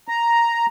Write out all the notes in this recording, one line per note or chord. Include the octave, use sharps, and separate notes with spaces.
A#5